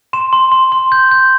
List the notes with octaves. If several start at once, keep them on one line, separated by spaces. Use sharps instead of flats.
C6 E7
C6
C6
C6
G6
G6